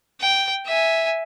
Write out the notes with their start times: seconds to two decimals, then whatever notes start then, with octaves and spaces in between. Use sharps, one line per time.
0.21 G5
0.66 E5 G#5